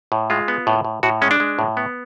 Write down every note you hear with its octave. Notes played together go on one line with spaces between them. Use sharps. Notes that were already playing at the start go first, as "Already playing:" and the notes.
A2
G#3 F4
B3
A2
A2
A2 F#4
G#3 C#4
D4
G#3
A2
B3